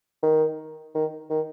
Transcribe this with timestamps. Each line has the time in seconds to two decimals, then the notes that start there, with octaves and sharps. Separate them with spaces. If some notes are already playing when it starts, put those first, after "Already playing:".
0.23 D#3
0.95 D#3
1.30 D#3